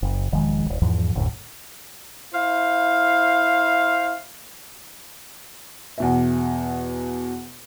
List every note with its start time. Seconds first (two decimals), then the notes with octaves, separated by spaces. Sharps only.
0.02 F#1
0.32 E1 D#3 F3 G#3
0.66 D#1 A#1
0.82 E2 G#2 E3 F3
1.15 F#1 D2 A2
2.34 E4 C5 F5
5.98 E2 B2 E5